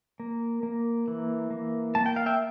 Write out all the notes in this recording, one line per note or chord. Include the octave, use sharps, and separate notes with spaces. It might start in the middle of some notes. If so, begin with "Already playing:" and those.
A#3
A#3
E3
A#3
A#3 A5
G5
F5
E5 G5